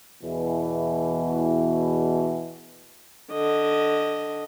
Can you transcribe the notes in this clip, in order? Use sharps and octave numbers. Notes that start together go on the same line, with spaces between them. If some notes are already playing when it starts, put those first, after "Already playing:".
E2 B2 E3
D3 D#5